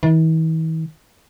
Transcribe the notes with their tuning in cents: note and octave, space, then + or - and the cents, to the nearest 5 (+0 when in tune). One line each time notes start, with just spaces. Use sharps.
E3 -45